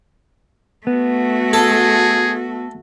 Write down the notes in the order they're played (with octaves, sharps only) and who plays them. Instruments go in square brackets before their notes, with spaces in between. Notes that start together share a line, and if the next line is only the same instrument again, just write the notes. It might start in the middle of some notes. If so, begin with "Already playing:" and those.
[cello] A3 F#4 [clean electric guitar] B3
[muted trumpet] G#4 [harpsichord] A4